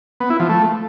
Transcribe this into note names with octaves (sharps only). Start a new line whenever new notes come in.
B3
E4
F3
A3